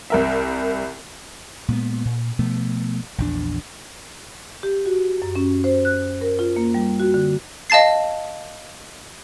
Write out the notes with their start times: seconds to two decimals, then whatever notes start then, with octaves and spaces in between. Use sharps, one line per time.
0.10 C2 A#4 E5
1.68 A#2 G#3 A3 B3
2.05 A#2
2.39 B2 F3 A3 B3
3.18 A#1 E2 D4
4.63 G4
4.86 F#4
5.22 F#2
5.35 C#4
5.64 C5
5.85 F#6
6.21 A#4
6.39 F4
6.56 A#3
6.74 G3
7.00 F#4
7.14 D3
7.70 D#5 F5 A5 A6 C7